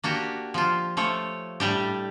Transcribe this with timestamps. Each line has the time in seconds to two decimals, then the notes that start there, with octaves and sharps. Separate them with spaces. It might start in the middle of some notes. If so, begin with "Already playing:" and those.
0.04 A#3 D4 F#4 G4
0.54 F3 F4
0.97 F3 A3 C#5
1.60 A2 G3 D4 G4